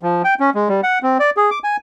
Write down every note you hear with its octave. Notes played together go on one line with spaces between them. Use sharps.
F3
G5
C#4
G#3
G3
F#5
C4
D5
G#4
D6
G#5